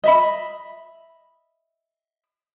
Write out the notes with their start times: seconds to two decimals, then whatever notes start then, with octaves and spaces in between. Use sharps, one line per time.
0.04 D#5 E5 B5